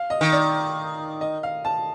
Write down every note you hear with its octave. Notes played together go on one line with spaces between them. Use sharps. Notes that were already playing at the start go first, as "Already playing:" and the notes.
Already playing: F5
D#5
D#3
D5
D#5
F5
A5